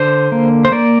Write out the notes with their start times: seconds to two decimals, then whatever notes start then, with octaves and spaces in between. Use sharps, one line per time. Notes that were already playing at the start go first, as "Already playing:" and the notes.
Already playing: D3 C5
0.32 A#3
0.65 C5
0.72 A#3 D5